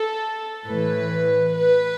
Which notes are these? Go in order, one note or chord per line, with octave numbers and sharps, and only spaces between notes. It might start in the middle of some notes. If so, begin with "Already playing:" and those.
Already playing: A4
A2 E3 B4
B4